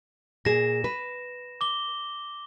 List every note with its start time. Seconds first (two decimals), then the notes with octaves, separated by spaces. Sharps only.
0.45 A#2 G#4 A#6 E7
0.84 B4
1.61 D6 G7